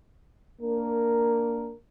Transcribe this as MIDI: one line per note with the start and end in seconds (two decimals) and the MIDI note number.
0.61 1.74 58
0.61 1.74 62
0.61 1.74 70